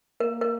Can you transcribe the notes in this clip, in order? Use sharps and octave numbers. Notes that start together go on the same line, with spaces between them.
A#3 A#4
A#4